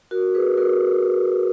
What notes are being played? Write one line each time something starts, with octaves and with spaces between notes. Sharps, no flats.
F#4 A#4
G#4 B4
F#4 A#4